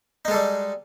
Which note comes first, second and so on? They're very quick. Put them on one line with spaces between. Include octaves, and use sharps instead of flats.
D#4 G#3 A4 G3